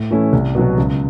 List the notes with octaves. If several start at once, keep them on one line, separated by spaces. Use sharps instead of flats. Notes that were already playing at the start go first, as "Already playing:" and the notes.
Already playing: A2
E3 A3 C#4 E4
C2
B2 F#3 B3
C#2